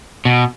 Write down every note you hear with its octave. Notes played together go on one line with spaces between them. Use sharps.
B2